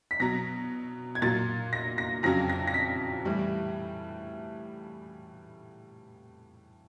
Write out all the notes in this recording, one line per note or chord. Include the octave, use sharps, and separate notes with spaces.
B6
B2 F#3 A#6
G#6
A#2 F#3 A6
A#6
A#6
F2 C#3 F#3 A#6
A#6
A#6
B6
A2 E3 G3